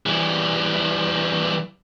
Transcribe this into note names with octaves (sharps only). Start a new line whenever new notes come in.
E3 G3